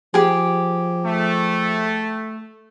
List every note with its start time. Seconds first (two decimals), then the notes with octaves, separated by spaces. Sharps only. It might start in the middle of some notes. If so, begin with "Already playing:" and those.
0.14 F3 G4 G#4
1.06 A3